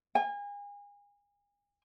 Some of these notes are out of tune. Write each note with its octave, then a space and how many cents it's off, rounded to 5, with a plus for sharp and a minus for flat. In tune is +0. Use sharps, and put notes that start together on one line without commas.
G#5 -35